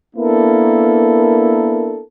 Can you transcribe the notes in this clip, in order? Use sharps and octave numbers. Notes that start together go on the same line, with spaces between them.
A#3 B3 D4 E4 A4 A#4